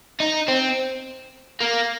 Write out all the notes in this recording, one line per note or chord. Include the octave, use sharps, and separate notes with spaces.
D#4
C4
A#3